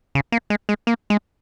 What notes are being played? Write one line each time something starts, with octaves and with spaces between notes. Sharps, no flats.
C#3
A#3
G#3
G#3
A#3
G#3